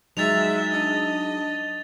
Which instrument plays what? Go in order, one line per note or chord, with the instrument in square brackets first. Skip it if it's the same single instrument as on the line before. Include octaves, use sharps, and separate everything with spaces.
[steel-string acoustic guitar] F#3 D#4 G#4 [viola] G#3 E5 [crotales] A6 F7
[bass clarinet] D4 [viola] D#5